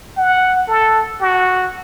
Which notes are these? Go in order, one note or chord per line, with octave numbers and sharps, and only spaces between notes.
F#5
A4
F#4